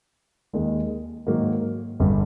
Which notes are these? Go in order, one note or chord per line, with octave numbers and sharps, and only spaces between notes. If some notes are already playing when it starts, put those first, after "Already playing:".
D#2 D#3 G#3
G#2 D#3 F#3 A#3
G1 G2 D3 G3